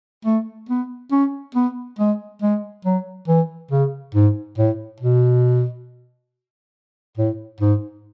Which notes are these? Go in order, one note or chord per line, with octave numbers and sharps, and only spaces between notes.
A3
B3
C#4
B3
G#3
G#3
F#3
E3
C#3
G#2
A2
B2
A2
G#2